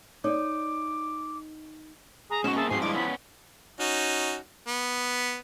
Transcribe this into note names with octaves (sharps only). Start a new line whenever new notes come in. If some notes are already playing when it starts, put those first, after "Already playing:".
D#4 C#5 D5 D6
G#4 A#5
G#2 B2 C#4 F#4 E7
A#3 C4 G#4 E5 A5
G#2 F3 C4 F#4 G#5 C7
G2 G#3 E4 D6
B3 C#4 B5
C#4 D#4 F#4
B3